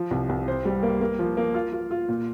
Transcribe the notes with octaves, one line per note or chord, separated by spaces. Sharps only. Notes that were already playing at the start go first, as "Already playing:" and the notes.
Already playing: F3
C2
C2
C5
G3
A#3
A#3
F3
A#3
F4
F4
F4
A#2